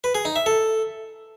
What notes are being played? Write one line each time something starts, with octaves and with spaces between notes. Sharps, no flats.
B4
G#4
D#4
E5
A4